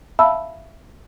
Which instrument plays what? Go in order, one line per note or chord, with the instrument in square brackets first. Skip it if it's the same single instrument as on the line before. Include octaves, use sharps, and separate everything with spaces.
[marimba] E5 F5 A5 B5 E6